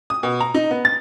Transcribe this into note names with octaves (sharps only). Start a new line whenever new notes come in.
D#6
B2
A#5
D#4
B3
A6